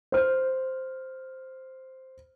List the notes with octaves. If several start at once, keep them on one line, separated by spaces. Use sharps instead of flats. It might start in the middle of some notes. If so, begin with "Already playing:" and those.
C5 F6